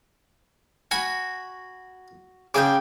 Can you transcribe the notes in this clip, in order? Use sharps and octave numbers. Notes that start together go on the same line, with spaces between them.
F#4 G#5 B5
C#3 G#4 G5 G#5 D6